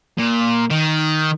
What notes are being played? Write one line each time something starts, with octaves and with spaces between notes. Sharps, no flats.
A#2
D#3